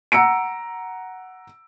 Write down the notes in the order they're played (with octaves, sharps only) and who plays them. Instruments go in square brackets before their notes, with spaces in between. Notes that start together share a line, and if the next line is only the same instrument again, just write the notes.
[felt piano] F#5 A#5 E6 C#7 D7